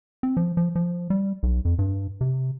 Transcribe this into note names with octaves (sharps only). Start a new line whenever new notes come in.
C4
F3
F3
F3
G3
B1
F2
G2
C3